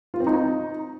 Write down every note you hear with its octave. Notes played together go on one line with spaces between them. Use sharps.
F4
C4
D#4